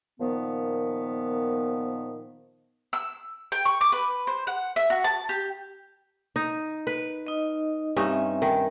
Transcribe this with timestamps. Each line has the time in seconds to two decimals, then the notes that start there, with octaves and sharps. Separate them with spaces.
0.20 A#2 D#3 F3 B3
2.93 E6
3.52 G5
3.65 C#6
3.81 D6
3.92 B4
4.27 C5
4.47 F#5
4.76 E5
4.90 F#4
5.04 A5
5.29 G4
6.36 D#4
6.87 B4
7.27 D#4 D#5
7.96 G2 C4 C#4 D#4 E5 G#5
8.42 D#3